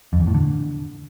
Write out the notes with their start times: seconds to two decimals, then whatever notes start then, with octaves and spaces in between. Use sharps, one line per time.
0.13 F2
0.20 E2
0.27 A2
0.34 D3